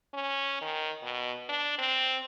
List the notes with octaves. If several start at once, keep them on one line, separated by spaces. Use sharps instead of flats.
C#4
D#3
B2
D4
C4